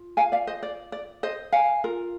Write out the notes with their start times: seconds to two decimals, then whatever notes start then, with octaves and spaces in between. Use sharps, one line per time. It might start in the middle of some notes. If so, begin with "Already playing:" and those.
Already playing: F4
0.17 F5 G#5
0.32 D5 F5
0.47 C5 D#5
0.63 D5
0.92 D5
1.23 C5 D#5
1.52 F5 G#5
1.84 F4 A#4